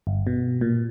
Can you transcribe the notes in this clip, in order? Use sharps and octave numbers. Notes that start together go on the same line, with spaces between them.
G1
B2
A#2